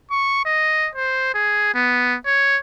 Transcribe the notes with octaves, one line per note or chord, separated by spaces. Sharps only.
C#6
D#5
C5
G#4
B3
C#5